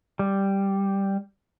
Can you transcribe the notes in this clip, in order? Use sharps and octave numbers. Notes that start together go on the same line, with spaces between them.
G3